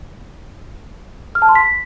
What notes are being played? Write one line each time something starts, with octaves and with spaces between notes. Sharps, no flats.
F6
A5
C6
B6